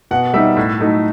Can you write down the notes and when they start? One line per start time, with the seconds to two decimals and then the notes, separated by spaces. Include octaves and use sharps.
0.11 B2 F#5
0.34 G3 D#4 E5
0.57 A2
0.79 F#3 A3 D#4